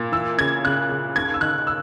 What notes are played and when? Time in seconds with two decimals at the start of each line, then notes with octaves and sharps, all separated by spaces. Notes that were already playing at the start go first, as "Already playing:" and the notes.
Already playing: A#2
0.12 E3 E6
0.38 C#3 G#6
0.65 C#3 F#6
0.89 C#3
1.16 D#2 G#6
1.34 E6
1.41 D#3 F#6
1.67 E6